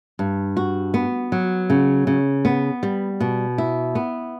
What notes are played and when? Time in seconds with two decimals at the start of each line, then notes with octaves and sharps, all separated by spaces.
0.19 G2
0.57 F#4
0.94 B3
1.32 F#3
1.70 C#3
2.07 C#3
2.45 B3
2.83 G3
3.21 B2
3.58 E4
3.95 B3